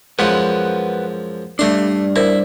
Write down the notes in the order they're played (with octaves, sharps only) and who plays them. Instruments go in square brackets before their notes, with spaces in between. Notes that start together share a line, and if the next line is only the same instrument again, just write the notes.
[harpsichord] F#2 F3 G#3 [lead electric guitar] B4 F#5
[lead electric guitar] G3 D4 [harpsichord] A3 C6
[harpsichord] E4 [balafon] A#4 C5 D5